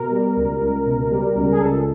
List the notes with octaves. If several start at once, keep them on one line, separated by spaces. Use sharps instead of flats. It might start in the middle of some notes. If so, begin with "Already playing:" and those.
Already playing: B2 A#4
G3
C#2
C#2
B2
G3
C#2
G#4
C#2 A4